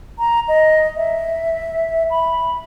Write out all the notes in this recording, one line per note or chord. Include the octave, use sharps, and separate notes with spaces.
A#5
D#5
E5
B5